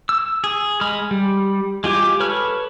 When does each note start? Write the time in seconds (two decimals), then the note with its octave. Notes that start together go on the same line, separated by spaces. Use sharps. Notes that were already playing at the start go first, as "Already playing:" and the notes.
0.09 E6
0.44 G#4
0.81 G#3 B5 F6
1.11 G3
1.84 G#3 F4 G4 G#5
2.20 A4 B4 C#5 B5 F6